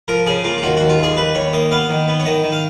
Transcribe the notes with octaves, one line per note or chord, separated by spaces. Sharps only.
F3 A#4
C#3 G#4
A#3 F4
F4
D#2 F#4
D#2 F#4
F4
D#2 G#4
D#2 B4
D#2 C#5
A#3 D#5
B3 F5
D#3
B3
C#5
D#3 D#5
D#3
F5